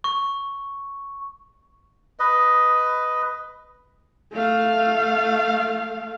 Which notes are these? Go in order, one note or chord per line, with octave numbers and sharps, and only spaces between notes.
C#6
B4 D#5
A3 F5